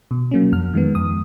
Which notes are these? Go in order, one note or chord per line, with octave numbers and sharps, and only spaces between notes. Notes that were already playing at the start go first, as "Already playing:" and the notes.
B2
F#3 A#3 C#4
F2 F6
D#3 G#3 B3
F2 D#6